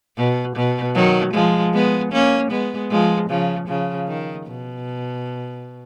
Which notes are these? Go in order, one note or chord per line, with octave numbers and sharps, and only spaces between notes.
B2
B2
D#3 F#3
F3 G#3
G#3 B3
A#3 C#4
G#3 B3
F3 G#3
C#3 F3
C#3 F3
D#3
B2